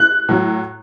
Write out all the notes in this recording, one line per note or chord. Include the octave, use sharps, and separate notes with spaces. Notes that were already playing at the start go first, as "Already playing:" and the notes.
Already playing: F#6
A2 F#3